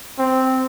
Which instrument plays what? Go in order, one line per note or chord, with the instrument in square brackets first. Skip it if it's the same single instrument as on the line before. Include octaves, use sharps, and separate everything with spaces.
[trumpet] C4